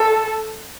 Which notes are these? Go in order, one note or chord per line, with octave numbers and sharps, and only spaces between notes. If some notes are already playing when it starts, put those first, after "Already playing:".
Already playing: A4